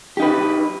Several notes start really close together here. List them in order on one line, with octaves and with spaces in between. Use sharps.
G4 D#4 B4